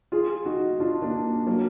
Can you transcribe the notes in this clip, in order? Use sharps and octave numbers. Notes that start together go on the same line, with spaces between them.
F4 G#4
D#4 F#4
D4 F4
A#3 D4
F#3 A#3